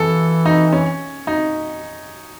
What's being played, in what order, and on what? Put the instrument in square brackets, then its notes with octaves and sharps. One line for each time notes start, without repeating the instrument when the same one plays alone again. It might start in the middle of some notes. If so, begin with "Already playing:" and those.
Already playing: [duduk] E3 [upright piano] A4
[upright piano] D#4
C#4
D#4